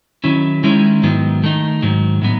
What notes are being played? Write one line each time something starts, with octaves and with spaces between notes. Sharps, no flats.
D#3 F#3 C#4 E4
D#3 G#3 C#4 E4
G#2 D#3 F#3 B3
D#3 A3 D#4
G#2 D#3 F#3
A2 F#3 B3 D#4